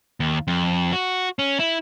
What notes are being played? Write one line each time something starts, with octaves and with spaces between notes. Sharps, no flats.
D#2
F2
F#4
C#4
E4